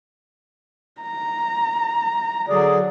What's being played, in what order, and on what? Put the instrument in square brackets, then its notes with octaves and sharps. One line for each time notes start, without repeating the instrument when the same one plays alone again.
[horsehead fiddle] A#5
[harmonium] D3 G#4 D5 [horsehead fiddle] F#3